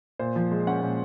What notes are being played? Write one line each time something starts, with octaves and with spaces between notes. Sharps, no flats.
A#2 C5
F3
G#3
C#4 F#5
A#2